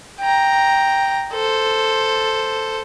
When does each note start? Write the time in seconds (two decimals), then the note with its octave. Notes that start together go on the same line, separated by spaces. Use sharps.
0.21 G5 A#5
1.33 A4 C5